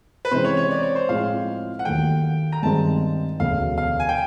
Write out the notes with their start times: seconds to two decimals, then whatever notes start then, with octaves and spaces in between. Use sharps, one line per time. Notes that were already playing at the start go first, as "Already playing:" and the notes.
0.25 B4
0.31 C3 E3 G#3 C#4 C5
0.45 C#5
0.57 C#5
0.71 D5
0.83 C#5
0.95 C5
1.09 A2 F3 G#3 C4 E4 F5
1.79 F#5
1.85 D#2 D#3 F#3 A3 G5
2.53 A#5
2.63 G2 D#3 G#3 C4 A5
3.40 E1 D2 C#3 F#3 B3 F5
3.78 F5
4.00 G#5
4.09 G5